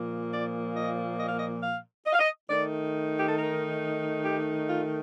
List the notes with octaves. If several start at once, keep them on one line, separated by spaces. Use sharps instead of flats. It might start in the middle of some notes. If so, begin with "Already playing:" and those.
Already playing: A#2 F3 A#3
D5
D#5
D#5
F5
D#5
F5
D#5
F5
D#5
D#3 A3 D#4 D5
G4
A4
A#4
G4
F4